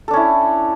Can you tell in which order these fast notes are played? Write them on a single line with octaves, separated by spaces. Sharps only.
A4 D4 C#4 E4